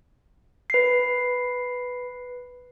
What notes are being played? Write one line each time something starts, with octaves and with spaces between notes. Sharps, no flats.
B4 C7